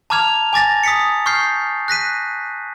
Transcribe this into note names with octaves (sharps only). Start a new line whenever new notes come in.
A5 A#5 D6 F6 G#6 F7
G#5 D6 A6 A#6
D#6 B6 C#7
C#6 F6 G6 C7
F#6 A#6 B6 D#7